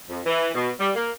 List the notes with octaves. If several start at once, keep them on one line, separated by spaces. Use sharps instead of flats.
F2
E3
B2
G3
A#3